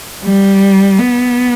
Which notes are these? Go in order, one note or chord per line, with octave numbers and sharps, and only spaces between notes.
G3
B3